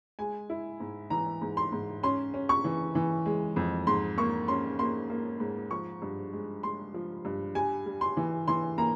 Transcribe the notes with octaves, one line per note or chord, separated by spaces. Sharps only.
G#3 G#5
E4
G#2
E3 A#5
G#2
C6
G#2
C#4 C6
C#4
C#6
E3
E3
G#3
F2
G#2 C6
A#3 C#6
C#4 C6
A#3 C6
A#3
G#2
F3 C#6
G2
G#3
G#3 C6
F3
G2
G3 G#5
G3
C6
E3
E3 C6
A#3 A#5